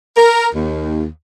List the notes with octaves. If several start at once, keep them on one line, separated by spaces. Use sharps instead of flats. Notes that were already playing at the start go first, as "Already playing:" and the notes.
A#4
D#2